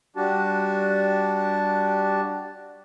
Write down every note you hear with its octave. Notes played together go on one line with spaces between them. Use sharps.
G3 D4 F#4 G4 A5